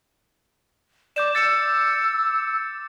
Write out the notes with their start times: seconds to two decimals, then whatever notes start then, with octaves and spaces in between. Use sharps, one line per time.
1.16 D5 D6 G6 E7
1.35 E6 A6 C#7